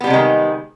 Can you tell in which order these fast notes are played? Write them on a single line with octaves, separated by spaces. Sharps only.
B3 G3 C3 G#3 D#3